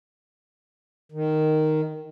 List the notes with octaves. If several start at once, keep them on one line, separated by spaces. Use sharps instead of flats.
D#3